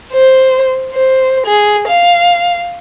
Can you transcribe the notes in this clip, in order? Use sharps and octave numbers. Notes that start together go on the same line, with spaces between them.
C5
C5
G#4
F5